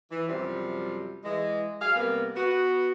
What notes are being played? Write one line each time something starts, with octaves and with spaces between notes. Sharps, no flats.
E3
F#2 C3 F3 G3 C4
E3 G#3
F#3 G#4 F5
C3 G3 A#3 B3
B3 F#4